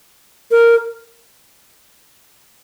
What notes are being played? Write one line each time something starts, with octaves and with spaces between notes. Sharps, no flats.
A#4